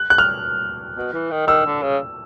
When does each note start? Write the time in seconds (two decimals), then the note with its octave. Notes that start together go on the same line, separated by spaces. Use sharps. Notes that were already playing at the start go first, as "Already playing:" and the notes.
Already playing: F#6
0.10 F#6
0.18 F6
0.96 B2
1.13 E3
1.31 D#3
1.47 D#3 E6
1.65 D3
1.82 C#3